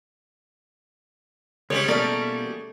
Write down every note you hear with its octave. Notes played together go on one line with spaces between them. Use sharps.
C#2 G3 G#3 C#4 C#5
B2 E3 A3 A#3 A#4 D5